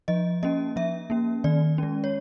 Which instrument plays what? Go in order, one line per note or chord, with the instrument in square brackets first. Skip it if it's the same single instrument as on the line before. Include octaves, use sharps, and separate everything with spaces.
[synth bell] F3 D#5
A#3 C#4 D#5
F3 E5
A#3 C#4
D#3 D5
G#3 C#4
C#5